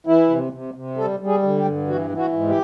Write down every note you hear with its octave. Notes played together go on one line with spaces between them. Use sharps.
E3 E4
C3
C3
C3
G3 A4
G3
G#4
D3
G4
G2
E3 F#4
E3
F#4
G#2
G4